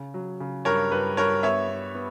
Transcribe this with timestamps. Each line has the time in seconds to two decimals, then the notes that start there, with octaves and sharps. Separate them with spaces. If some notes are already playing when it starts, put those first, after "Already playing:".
Already playing: C#3
0.14 F#3
0.40 C#3
0.65 G2 A#4 C#5
0.92 G2 B4
1.17 G2 A#4 C#5
1.43 B3 C#5 E5
1.69 B3
1.95 B3